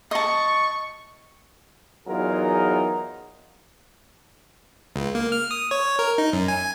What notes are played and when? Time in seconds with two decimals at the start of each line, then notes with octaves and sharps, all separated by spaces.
0.11 D#5 A5 C#6
2.08 E2 F#3 D#4 F4 G#4 A#4
4.96 C#2
5.15 A#3
5.32 F6
5.51 D#6
5.71 C#5
5.99 A#4
6.18 D#4
6.33 F#2
6.48 G#5